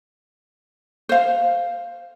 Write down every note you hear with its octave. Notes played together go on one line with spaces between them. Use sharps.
C5 F5